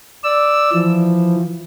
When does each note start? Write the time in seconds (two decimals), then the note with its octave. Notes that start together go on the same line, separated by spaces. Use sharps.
0.24 D5 E6
0.73 E3 F3